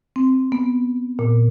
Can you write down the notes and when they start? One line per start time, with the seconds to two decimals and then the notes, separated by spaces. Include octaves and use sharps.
0.16 C4
0.52 B3
1.19 A#2